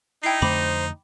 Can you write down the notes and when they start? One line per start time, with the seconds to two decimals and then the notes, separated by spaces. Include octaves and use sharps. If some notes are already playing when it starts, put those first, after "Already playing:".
0.24 D#4 E4 G5 C7
0.42 F2 D3 A3 C5 B5 D6